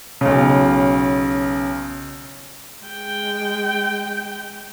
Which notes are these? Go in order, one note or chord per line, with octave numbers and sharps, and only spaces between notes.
B1 C#3
G#3 G5